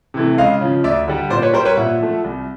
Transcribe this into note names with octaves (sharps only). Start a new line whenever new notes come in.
C3 E3 A3
C#2 D#5 F5
C#3 F3
D2 D5 E5
D3 G3
A#2 C5 D5
B4 C#5
G3 A#4 C5
B4 C#5
A#2 E5 F#5
F3 A3
C2